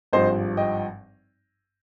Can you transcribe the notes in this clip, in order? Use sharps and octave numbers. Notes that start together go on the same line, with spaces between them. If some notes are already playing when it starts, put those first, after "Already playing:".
G#1 G2 F3 C5 D#5
D#5 G5